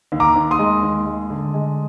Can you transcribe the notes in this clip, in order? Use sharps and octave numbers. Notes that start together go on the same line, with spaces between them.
D#2
A#5 D6
D#2
C6 D#6
G#3
D#2
G#3
D3
G#3